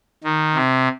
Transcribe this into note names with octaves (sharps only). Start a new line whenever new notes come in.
D#3
C3